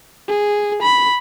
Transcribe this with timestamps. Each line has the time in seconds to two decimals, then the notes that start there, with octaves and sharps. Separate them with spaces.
0.28 G#4
0.82 B5